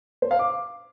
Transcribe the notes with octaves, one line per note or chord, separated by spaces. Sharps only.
C5
F5
D6